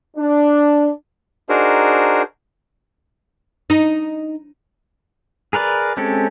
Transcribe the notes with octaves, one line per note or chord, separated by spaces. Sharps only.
D4
D4 D#4 F#4 G#4 A#4 C5
D#4
G#4 A#4 B4 D5
G#3 C4 C#4 G4 A4